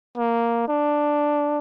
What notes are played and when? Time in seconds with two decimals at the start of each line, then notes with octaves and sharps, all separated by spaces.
0.17 A#3
0.68 D4